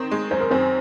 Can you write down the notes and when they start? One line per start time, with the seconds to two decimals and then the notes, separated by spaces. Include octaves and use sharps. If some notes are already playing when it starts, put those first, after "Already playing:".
Already playing: D#3 C4
0.11 G#3
0.31 F#2 C5
0.40 A#4
0.50 F#2 C4 C5